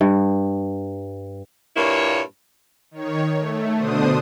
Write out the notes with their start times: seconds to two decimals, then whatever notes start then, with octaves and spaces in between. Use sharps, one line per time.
0.01 G2
1.77 G2 A#2 A#3 E4 C#5
2.91 D#3 C#5
3.38 A3
3.77 B2 D3 D4 C5 D#6